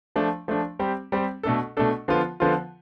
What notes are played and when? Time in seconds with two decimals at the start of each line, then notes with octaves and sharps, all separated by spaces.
0.16 F3 A3 D4
0.48 F3 A3 D4
0.79 G3 C4 G4
1.12 G3 C4 G4
1.43 B2 A3 D4 A4
1.77 B2 A3 D4 A4
2.08 D3 F3 B3 F4
2.40 D3 F3 B3 F4